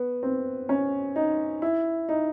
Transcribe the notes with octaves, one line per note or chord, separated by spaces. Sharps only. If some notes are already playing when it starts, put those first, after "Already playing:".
Already playing: B3
C4
C#4
D#4
E4
D#4